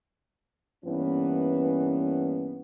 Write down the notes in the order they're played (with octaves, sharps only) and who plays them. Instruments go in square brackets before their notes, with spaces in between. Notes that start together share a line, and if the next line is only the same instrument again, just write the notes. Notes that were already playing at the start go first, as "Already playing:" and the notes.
[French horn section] G2 E3 A#3 B3 C#4